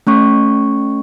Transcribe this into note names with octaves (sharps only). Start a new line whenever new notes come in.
A3 C#4 C#6